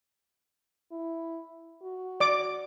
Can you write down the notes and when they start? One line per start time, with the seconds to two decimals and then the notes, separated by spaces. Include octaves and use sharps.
0.92 E4
1.82 F#4
2.20 D5 D6